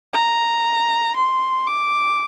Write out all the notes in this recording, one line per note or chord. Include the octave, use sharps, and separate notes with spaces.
A#5
C6
D6